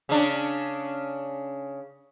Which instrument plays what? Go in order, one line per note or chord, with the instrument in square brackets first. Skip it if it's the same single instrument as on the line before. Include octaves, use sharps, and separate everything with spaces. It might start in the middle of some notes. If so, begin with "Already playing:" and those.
[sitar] C#3 D4